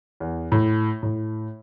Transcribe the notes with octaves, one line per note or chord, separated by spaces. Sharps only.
E2
A2
A2